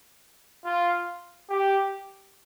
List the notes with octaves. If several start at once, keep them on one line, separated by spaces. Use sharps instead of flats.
F4
G4